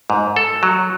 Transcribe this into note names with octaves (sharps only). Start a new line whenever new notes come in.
G#2
A4
F#3